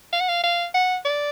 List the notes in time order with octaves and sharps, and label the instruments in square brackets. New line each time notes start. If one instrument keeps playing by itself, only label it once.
[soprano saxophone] F5
F#5
F5
F5
F#5
D5